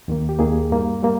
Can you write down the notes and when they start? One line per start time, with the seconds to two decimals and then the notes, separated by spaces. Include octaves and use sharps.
0.08 D#2 D#3 A#3
0.29 G4
0.39 D#2 D#3 A#3 G#4
0.70 G2 G3 A#3
1.03 G3 A#3